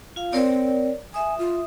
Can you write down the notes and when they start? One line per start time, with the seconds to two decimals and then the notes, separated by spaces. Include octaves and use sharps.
0.16 F4 F5
0.33 C4 A#4 C#5 D5
1.14 E5 G#5 D#6
1.39 F4